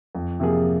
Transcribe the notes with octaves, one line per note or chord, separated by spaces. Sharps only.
F2
C3 F3 A#3 G#4